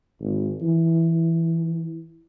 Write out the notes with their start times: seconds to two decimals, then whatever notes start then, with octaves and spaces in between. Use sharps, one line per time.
0.20 G#1
0.62 E3